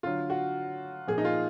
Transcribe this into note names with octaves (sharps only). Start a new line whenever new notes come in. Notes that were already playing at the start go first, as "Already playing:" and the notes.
D3 F#3 F4
F#4
A#2 F3 G#4
D#4
F4